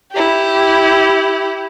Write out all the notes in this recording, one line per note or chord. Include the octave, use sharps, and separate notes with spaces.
E4 G4